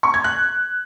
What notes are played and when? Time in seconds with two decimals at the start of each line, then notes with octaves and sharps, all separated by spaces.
0.03 C#6
0.14 G#6
0.24 F#6